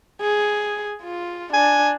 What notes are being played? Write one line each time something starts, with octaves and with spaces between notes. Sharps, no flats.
G#4
F4
D4 G#5